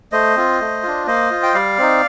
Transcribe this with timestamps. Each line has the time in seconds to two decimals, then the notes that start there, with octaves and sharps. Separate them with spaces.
0.12 A3 C5 D#5
0.36 C4 F4
0.60 A3
0.83 D4 F4
1.07 A#3 C5 D#5
1.31 F4
1.43 G5
1.54 G3 D5 F5
1.78 C4 D#4